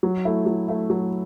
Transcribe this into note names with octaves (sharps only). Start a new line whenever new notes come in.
F#3
A3 E4
F#3
A3 E4
F#3